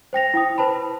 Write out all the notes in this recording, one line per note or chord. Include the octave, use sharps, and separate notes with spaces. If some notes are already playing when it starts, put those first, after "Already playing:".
C5 G5 A#6 F7
E4 G5 D#6
B4 C5 A5 B5